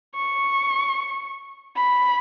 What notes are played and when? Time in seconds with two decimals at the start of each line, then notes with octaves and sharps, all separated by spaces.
0.15 C#6
1.76 B5